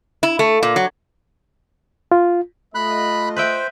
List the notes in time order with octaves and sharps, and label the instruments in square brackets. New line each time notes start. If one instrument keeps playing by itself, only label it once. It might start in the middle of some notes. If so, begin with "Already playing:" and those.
[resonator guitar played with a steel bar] E4
A3
A#2
F#3
[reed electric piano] F4
[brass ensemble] A3 F4 D#5 [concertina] B5 F#6
[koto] B4 E5 G5 [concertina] C5